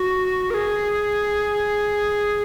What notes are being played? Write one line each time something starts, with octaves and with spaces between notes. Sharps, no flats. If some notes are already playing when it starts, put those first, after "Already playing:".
Already playing: F#4
A#4
G#4